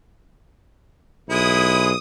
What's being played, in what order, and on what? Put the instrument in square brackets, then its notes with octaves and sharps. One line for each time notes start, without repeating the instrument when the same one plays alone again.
[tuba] B1 [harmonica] G#3 E4 [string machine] D#6